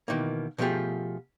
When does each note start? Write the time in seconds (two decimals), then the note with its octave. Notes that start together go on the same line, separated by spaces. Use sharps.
0.08 B2 D#3 E3 A#3
0.58 B2 F3 A3 F4 G4 G#4